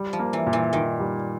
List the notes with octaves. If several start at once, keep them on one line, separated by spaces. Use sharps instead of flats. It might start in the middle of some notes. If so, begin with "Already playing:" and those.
Already playing: G3
F3
A#3
E3
A#2
E3
A#2 D#3
G3